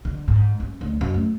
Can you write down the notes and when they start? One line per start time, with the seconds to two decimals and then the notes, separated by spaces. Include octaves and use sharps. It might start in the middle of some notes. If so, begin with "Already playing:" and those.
0.05 D3
0.28 G#2
0.60 C#4
0.81 D2
1.01 F#2
1.14 A3